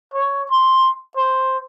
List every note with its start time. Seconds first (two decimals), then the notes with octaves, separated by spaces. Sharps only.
0.14 C#5
0.51 C6
1.17 C5